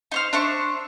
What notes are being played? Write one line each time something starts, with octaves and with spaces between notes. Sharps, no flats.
D#4 C5 F6
D4 C5 E5 C#6